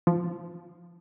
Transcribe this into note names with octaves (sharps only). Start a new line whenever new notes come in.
F3